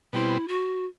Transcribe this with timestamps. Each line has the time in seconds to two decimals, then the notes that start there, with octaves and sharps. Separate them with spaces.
0.13 B2 G3 C4 E4
0.48 F#4